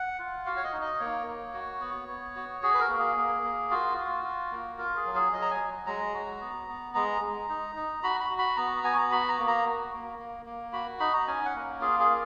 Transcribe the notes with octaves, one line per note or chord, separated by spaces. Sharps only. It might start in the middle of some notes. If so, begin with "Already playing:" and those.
Already playing: F#5
F4
F#4 F5
C#5
D#5
D#4
D#5
A#3 C#5
A#3
F#4
B3
B3
F#4
F#4 G#4
B4
A#4
A#3
G#4
A#3
A#3
F4 F#4
F4
F4
A#3
F4 A#4
G#4
F#3
G#4
F#3 D#5
A#5
G#5
F#3
G#3 A#5
F#4
B3
B3
G#3 A#5
G#3
D#4
D#4
F#4 B5
B5
F#4
B5
B3 A#5
B3 G#5
A#5
F#4 B5
A#5
A#3
A#5
F#4
A#3
A#3
A#3
F#4 B5
D#4 B5
A#5
C#4 G#5
F#5
A#3
F4 G#4
G#4
A#3